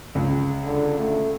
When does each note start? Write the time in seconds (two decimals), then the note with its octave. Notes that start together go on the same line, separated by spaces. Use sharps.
0.15 C#2
0.65 D3
0.99 A3